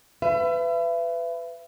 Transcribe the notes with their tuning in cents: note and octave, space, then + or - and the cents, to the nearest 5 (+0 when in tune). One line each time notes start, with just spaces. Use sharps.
B4 +25 E5 +40